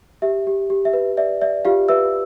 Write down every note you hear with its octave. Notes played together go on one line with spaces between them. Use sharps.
G4 E5
G4
G4
E5
B4
D5 E5
D5 E5
F4 G4 F5
B4 E5 E6